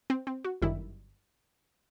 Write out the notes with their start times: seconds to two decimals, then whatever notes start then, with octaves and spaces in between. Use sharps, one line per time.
0.10 C4
0.27 C4
0.44 F#4
0.62 G1 F#2 D#3 G3 E4